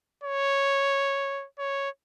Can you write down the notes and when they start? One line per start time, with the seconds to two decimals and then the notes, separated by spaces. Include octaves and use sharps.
0.23 C#5
1.59 C#5